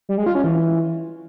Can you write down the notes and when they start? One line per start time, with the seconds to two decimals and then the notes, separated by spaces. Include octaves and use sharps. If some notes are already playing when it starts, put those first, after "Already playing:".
0.09 G3
0.18 G#3
0.26 F4
0.35 C#4
0.44 E3